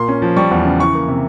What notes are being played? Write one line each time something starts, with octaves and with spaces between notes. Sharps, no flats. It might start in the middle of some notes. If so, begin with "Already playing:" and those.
Already playing: A#2 A#3 C6
C#4
F3
G3 C#6
E2
C#3
E3 C#6
A#3
C3